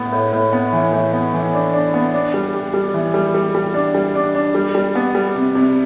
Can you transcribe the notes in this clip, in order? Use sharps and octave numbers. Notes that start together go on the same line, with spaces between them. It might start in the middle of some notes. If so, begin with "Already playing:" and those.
Already playing: A2 B3
A2
A2
B3
E3
A2
B3
E3
D4
D4
B3
D4
G3
G4
G3
E3
G3
G3
G3
D4
G3
D4
D4
G3
G3
B3
G3
C3
C3